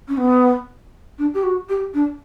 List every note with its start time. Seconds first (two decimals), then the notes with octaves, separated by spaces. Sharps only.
0.08 C#4
0.17 B3
1.18 D4
1.34 G4
1.43 F#4
1.69 G4
1.94 D4